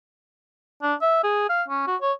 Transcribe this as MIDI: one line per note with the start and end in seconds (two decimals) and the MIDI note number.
0.82 0.94 62
1.01 1.22 76
1.23 1.47 68
1.49 1.63 77
1.68 1.85 61
1.87 1.96 66
2.01 2.12 73